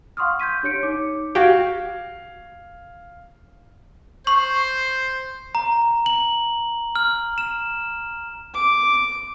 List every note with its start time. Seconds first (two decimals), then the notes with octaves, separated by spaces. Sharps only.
0.17 F5 F#5 C6 C#6 D#6 F6
0.40 G6 G#6 B6 D#7
0.63 D4 G4 C#5 G6 C#7 D7
0.83 D#4 C#5 D6
1.35 F#4 G4 F5 G#6
4.27 C5 C#6
5.55 A#5
6.06 F#7
6.96 F6
7.38 E7
8.55 D6